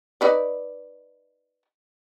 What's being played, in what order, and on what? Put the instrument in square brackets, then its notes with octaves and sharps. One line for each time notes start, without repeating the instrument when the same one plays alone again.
[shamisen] D#4 B4 D5